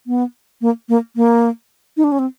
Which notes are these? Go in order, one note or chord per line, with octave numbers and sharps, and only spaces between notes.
B3
A#3
A#3
A#3
D#4
D4
C#4
C4